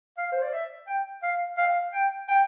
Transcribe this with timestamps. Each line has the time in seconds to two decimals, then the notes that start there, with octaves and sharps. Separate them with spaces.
0.18 F5
0.32 C5
0.42 D5
0.53 E5
0.87 G5
1.23 F5
1.58 F5
1.93 G5
2.28 G5